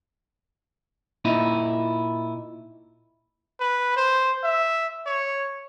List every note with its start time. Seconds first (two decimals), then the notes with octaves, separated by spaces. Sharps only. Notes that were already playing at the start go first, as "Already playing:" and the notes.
1.25 A#2 D#4 E4
3.60 B4
3.97 C5
4.44 E5
5.06 C#5